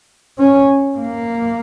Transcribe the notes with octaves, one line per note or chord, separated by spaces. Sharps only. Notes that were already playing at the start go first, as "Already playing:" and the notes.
C#4
A#3